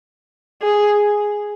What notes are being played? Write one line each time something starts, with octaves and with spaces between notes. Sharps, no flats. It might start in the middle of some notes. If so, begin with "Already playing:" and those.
G#4